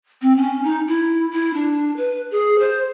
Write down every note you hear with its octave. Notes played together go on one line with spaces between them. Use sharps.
C4
C#4
D#4
E4
E4
D4
B4
G#4
C5